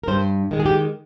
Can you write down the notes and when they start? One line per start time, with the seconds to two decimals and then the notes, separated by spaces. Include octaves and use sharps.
0.04 A#4
0.08 G2 C5
0.51 D#3 G#3
0.60 G#4
0.66 G4